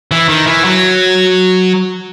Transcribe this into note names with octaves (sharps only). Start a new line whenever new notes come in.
E3
D#3
E3
F#3